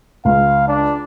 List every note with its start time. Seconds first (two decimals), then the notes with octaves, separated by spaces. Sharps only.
0.25 C#2 F5
0.68 D4